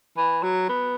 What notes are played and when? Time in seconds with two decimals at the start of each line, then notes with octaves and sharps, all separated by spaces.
0.17 E3
0.43 F#3
0.69 B3